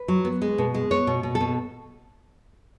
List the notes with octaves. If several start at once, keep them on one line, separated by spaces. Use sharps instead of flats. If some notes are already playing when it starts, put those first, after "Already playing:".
Already playing: B4
F#3
B3
G#3
B2
G#3
B3 C#5
B2
B2
A4
B2